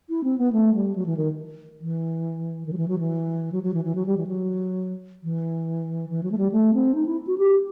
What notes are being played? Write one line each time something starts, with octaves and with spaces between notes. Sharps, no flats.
E4
C4
B3
A3
G3
F#3
E3
D#3
E3
D#3
F#3
E3
F#3
E3
F#3
F#3
E3
E3
F#3
G3
E3
F#3
E3
E3
F#3
A3
G3
A3
C4
D#4
E4
F#4
G4